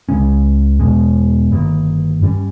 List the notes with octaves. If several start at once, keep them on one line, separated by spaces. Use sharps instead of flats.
C#2 C#3 G#3 C#4
E2 B2 G#3
G1 G2 D#3 A#3
G2 G3 C#4